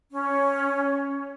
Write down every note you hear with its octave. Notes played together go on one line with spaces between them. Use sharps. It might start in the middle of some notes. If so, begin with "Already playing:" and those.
C#4